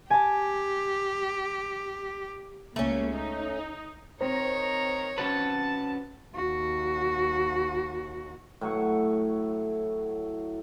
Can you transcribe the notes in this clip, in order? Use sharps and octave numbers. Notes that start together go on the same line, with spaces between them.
G4 G#5 A5
C#2 C#3 A3 A#3 C#4
D#4
D#3 C4 C5 C#5 A#5
C#4 F#4 B4 A5
D#2 F#4
A2 F#3 C#5 F#5